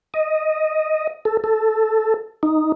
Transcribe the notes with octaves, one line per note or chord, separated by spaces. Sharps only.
D#5
A4
A4
D#4